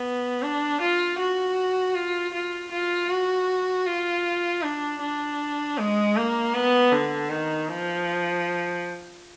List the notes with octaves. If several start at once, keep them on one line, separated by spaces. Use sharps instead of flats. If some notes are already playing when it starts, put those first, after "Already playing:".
Already playing: B3
D4
F4
F#4
F4
F4
F4
F#4
F4
D4
D4
G#3
A#3
B3
D3
D#3
F3